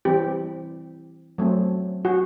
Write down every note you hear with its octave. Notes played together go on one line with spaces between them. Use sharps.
E3 G3 C4 G4
F#3 A3 C4
F#4